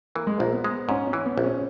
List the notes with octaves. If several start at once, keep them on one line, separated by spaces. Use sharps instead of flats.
E3 A#3
G#3
A#1 A#3
B3
G#3
G#2 C#4
C#4
E3
B3
A#1
C#4